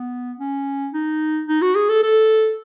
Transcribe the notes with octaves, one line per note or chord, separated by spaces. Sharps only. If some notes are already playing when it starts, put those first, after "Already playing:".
Already playing: B3
C#4
D#4
D#4
F#4
G#4
A4
A4